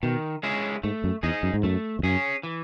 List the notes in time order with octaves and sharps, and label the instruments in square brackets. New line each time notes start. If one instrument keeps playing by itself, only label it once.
[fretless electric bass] B2 [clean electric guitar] D#3
[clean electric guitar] G#3 C#4 E4 G#4
[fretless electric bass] G#2 [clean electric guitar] A3
[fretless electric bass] F#2
[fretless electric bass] E2 [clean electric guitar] D#4 G#4 D#5
[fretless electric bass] F#2
G#2
[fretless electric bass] F#2 [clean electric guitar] A3
[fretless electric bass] E2
[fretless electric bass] F#2 [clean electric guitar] C#4 G#4
[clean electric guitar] E3